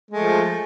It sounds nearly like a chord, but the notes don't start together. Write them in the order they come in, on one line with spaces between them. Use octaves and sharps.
G#3 A3 F3